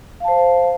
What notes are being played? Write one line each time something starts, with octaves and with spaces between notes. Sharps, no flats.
C5 F5 A5